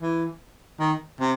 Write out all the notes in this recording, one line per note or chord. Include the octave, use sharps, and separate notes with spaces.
E3
D#3
C3